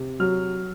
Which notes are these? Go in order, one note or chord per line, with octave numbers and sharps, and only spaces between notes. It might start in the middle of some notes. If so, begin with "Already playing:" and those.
Already playing: C3
F#3 F6